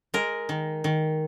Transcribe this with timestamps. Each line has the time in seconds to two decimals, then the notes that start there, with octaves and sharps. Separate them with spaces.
0.14 G#3 A#4
0.49 D#3
0.84 D#3